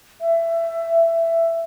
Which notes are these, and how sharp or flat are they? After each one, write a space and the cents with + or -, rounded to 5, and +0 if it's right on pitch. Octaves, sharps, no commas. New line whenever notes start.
E5 +15